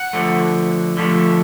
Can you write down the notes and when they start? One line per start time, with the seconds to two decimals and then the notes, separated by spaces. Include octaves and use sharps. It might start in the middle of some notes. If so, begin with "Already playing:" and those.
Already playing: F#5
0.13 D3 F3 A3
0.97 D3 F3 A3